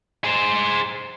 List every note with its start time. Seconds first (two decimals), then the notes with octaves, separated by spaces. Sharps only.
0.24 G#4 C5